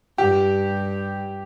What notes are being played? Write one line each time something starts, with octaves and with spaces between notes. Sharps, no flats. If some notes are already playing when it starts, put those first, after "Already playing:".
G2 G4